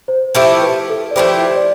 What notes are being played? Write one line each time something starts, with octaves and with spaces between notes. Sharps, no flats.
C5
F3 A3 E4 G4 C5
B4
A4
D5
F3 A3 E4 G4 C5
D5